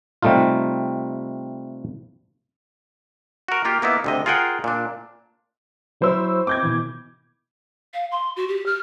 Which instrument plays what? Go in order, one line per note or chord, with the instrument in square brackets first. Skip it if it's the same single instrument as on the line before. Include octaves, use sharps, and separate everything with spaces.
[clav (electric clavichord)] C3 G3 A3 D#4 F4
F#4 A#4
A#3 F4 G4
A#3 B3 D#4 E4
D2 C3 D#5
F4 G#4 A#4 F#5 G5
A#2 D4
[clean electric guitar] F#3 E4 [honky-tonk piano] C5 E6
[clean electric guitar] C4 [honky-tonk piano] D6 G6 G#6
[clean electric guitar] B2 D#3 E3
[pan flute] F5
C6
F#4
G4
F6